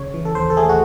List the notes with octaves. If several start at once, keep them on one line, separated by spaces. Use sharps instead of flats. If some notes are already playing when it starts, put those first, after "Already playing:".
Already playing: C#3 C#5
E3
A4
D#2 C5
A4
A3 G#4
F#4